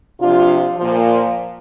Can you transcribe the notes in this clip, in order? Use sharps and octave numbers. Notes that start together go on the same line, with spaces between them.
C3 F3 D4 F4
A#2 F3